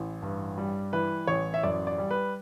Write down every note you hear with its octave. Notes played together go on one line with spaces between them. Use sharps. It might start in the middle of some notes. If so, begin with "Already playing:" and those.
Already playing: A1 E3
G2
G3
E3 B4
A1 C#5
E5
F#2 D5
D5
G3
B4